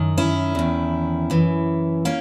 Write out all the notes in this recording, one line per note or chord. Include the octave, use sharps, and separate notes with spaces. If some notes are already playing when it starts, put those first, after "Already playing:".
Already playing: F#2 D#3
C#4 E4
E2 D#3
F#2 E3
A#3 C#4